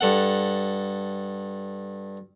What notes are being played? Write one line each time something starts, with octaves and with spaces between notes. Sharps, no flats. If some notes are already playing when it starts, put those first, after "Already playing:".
G2 A4 F#5